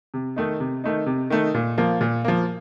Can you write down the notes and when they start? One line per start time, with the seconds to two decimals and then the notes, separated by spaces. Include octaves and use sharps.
0.14 C3
0.36 D#3 A3 D#4
0.60 C3
0.84 D#3 A3 D#4
1.06 C3
1.30 D#3 A3 D#4
1.54 A#2
1.78 F3 A#3
2.01 A#2
2.25 F3 A#3